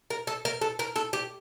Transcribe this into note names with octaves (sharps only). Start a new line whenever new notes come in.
A#4
A4
A#4
A4
A#4
A4
G4